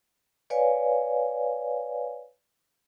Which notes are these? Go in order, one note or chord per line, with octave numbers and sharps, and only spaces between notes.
B4 C#5 D5 F5 G#5